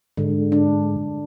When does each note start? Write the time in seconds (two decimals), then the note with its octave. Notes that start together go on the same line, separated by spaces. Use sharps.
0.17 G#2 D3
0.52 D4